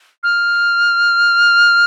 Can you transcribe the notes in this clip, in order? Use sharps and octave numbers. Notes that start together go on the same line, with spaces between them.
F6